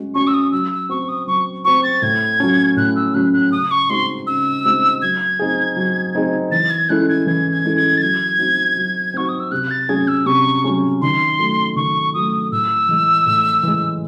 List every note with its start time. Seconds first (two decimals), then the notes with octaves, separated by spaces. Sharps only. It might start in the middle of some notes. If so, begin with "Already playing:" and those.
Already playing: G#3 C#4 F#4
0.14 C#4 F#4 C#6
0.27 E6
0.34 D#6
0.52 F#3 E6
0.71 E6
0.89 C4 F#4 C#6
1.09 D#6
1.27 F#3 C#6
1.64 C4 F#4 C#6
1.83 A6
2.02 A2 G#6
2.40 F#3 C#4
2.76 A2 F#6
2.95 E6
3.14 F#3 C#4 F#6
3.33 F#6
3.52 C#3 D#6
3.71 C#6
3.89 G#3 C4 D#4 F#4 C6
4.26 C#3 E6
4.64 G#3 C4 D#4 F#4
5.02 F#3 G#6
5.39 C4 D#4 G#4
5.76 F#3
6.15 C4 D#4 G#4
6.51 E3 A6
6.70 G#6
6.89 G#3 C#4 E4 A4 F#6
7.09 G#6
7.27 E3 G#6
7.52 G#6
7.64 G#3 C#4 E4 A4
7.77 G#6
7.97 A6
8.02 F#3 G#6
8.39 C4 D#4 F#4
8.77 F#3
9.14 C4 D#4 F#4 C#6
9.29 D#6
9.40 E6
9.51 C3 F#6
9.70 A6
9.89 F#3 C#4 G#4 G#6
10.08 E6
10.26 C3 C#6
10.64 F#3 C#4 G#4
11.01 D#3 C6
11.38 F#3 A3
11.76 D#3 C#6
12.14 F#3 A3 D#6
12.52 A2 E6
12.89 E3 G#3
13.26 A2
13.63 E3 G#3